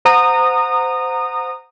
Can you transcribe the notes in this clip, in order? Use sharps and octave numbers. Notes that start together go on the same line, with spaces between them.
C5 F#5 A#5 D#6